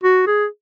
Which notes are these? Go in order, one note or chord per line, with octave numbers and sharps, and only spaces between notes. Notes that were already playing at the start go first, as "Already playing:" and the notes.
F#4
G#4